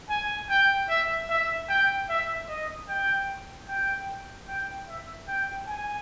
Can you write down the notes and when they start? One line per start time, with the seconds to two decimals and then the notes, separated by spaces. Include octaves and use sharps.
0.09 G#5
0.50 G5
0.89 E5
1.30 E5
1.69 G5
2.09 E5
2.49 D#5
2.88 G5
3.68 G5
4.48 G5
4.88 E5
5.28 G5
5.68 G#5